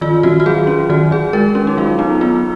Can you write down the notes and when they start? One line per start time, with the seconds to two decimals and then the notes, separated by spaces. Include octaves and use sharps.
0.01 D#3 F4
0.23 D#3 F#4
0.40 F#4
0.46 F#3 G#4
0.67 C#4
0.89 D#3 F#4
1.11 D#3 G#4
1.33 G#3 A#4
1.55 C#4
1.67 D#4
1.77 F#3 F4
1.99 B3 D#4
2.21 B3 F4